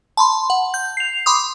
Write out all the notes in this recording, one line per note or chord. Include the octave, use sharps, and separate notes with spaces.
A5 B5 C6
F#5
G6
C7 F7
B5 C6 D6 D#6